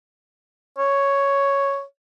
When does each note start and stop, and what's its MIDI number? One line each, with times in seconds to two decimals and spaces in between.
0.79 1.83 73